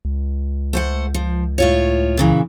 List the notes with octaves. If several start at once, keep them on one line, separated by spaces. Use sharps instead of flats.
C#2
A3 C5 F#5
F3
A2 F4 C#5
A#2 C#3 E3